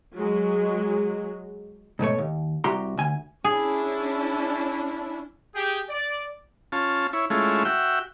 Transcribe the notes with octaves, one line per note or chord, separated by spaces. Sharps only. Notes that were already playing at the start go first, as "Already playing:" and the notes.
F#3 G#3
G#2 B2 A3 C#5
D#2
C2 F#4 G4 A#5 C6
D2 G#5
C#4 D4 E4 G#4
G4 G#4 G5
D5
C#4 F4 A5
E4 C#5
G#3 A3 C#4 E4 F4
F#4 E5 G5